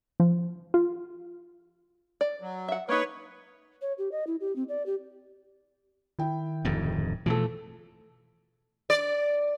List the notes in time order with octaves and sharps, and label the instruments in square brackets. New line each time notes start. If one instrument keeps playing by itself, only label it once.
[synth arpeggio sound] F3
F4
[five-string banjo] D5
[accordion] F#3
[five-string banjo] E5 F#5
[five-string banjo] A#3 D#4 [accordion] B4 C#5
[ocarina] C#5
G4
D#5
E4
G4
C4
D5
G4
[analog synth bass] D#3 [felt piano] E4 G5
[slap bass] D1 F2 G#2
[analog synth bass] B2 [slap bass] E3 G#3 A3 [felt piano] F3 A4
[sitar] D5